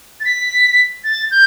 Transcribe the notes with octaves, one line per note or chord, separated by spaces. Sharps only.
A6
B6
A6
G6